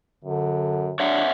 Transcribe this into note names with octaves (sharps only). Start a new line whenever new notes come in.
F#2 D3
D4 C#5 E5 F#5